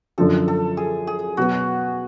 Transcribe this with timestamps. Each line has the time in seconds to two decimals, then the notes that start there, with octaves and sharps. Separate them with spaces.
0.18 F#2 D3 F3 A4
0.48 A4
0.77 G#4
1.07 G#4
1.37 B2 F#3 B3 F#4